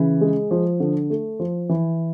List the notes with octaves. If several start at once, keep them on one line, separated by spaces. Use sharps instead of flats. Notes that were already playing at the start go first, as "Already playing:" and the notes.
Already playing: C#3 E3
G#3
F3
D3
A3
F3
E3